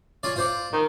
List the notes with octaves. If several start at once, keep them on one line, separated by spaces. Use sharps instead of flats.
C#4 F4 D5
F4 C5 D5
D#3